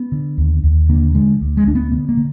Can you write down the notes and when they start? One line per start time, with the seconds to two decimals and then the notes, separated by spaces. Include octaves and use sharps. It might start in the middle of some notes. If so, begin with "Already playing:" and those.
Already playing: B3
0.12 D3
0.38 D#2
0.63 D#2
0.89 D3 A#3
1.15 D3 G#3
1.41 D2
1.57 G#3
1.66 D2 D4
1.75 B3
1.92 D3 B3
2.09 A#3
2.17 D3